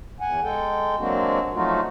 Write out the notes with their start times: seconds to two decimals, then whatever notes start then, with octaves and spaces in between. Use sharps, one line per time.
0.21 E2 F#5 G#5
0.43 G#3 A4 G5
0.99 F#3 G#3 A#3 C4 D4 F#4
1.54 F3 F#3 A3 D#4 F4 F#4